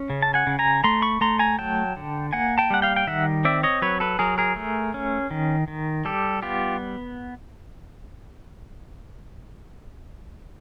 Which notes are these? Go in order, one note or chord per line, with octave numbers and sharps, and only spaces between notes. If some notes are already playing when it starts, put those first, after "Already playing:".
Already playing: C#4
C#3
A5
F#5 G#5
C#3
G#5 A#5
A3 A#5 C6
B5 C#6
A3 A#5 C6
G#5 A#5
F#3 G5 A5
D3
A#3 F#5 G#5
G5 A5
G3 F#5
F5 G5
G5
D#3 E5 F#5
C4 D5 E5
C#5 D#5
F#3 B4 C#5
A4 B4
F#3 G#4 A#4
G#4 A#4
A3
C#4
D#3
D#3
G3 G4 A4
B3 F4 G4